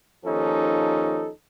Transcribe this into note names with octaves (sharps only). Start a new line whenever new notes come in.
D#2 F3 C#4 D#4 A4